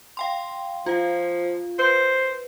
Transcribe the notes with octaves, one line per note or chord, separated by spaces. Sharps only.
F5 G5 C6
F3 F4 F5
B4 C5